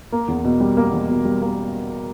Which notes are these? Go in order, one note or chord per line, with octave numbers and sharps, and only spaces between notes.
A#3
E2
B2
G3
A#3
E2
B2
G3
A#3